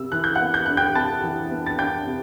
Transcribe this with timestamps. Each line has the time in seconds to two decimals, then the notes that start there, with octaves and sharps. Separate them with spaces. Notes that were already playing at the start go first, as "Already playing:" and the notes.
Already playing: C3 E6
0.12 E3 F#6
0.24 G6
0.35 B3 F#5 F#6
0.54 G6
0.66 D4 F#6
0.77 G5 G6
0.95 C3 A5 A6
1.23 E3
1.51 B3
1.66 A6
1.79 D4 G5 G6
2.07 C3